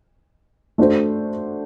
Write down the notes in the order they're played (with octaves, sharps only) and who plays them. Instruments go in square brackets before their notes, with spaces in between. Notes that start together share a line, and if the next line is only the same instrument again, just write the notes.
[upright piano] A3 D4 F#4 C5